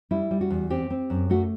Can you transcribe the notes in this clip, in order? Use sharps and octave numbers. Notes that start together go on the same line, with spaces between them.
G3 E4
G3
F#4
E2
C4 G4
C4
F#2
A3 F#4